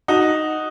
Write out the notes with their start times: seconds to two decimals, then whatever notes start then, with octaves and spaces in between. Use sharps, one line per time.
0.08 D#4 F#4